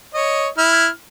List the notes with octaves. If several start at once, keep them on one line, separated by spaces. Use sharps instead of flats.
C#5 D#5
E4 F6